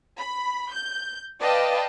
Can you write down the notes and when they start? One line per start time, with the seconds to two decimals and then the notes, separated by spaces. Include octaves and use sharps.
0.20 B5
0.73 G6
1.41 B4 D5 D#5 F5 G5 A5